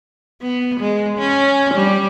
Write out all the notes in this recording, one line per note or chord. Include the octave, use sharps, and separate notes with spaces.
B3
G#3
C#4
G3